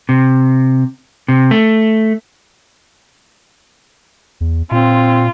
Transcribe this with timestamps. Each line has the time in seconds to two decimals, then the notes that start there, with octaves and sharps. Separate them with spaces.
0.09 C3
1.28 C3
1.51 A3
4.41 E2
4.71 A#2 C4 F4